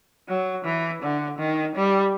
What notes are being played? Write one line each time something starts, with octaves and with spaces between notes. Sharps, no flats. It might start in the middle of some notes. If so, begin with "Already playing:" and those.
F#3
E3
D3
D#3
G3